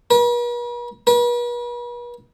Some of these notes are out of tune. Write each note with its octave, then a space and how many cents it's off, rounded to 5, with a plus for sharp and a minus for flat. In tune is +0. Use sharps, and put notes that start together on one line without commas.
B4 -45
B4 -40